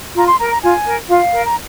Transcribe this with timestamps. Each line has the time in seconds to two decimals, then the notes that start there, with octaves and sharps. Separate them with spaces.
0.16 F4 A#5
0.27 C6
0.39 A#4 A#5
0.50 A#5
0.61 F4 G#5
0.85 A#4
1.08 F4 F5
1.32 A#4
1.46 A#5